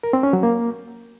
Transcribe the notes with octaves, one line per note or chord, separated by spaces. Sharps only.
A#4
C4
C#4
F#3
A#3